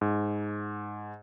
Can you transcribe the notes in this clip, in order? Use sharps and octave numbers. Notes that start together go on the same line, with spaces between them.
G#2